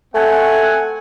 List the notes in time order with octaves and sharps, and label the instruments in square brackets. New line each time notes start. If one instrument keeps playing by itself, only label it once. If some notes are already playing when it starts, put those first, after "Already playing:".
[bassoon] A3 [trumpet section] C4 F#5 G#5